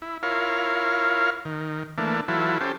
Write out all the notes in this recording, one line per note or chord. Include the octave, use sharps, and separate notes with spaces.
E4
E4 F4 A#4 C#5 F5
D#3
E3 A3 A#3 D4
E3 F#3 E4 F4 A4
C#4 G4 A4 C5